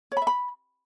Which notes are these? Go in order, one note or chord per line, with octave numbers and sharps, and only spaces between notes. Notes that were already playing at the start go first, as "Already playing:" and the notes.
C#5
B5
E5
B5